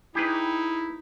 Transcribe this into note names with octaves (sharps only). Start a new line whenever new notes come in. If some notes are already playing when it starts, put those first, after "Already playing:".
D#4 E4 G4 G#4 B4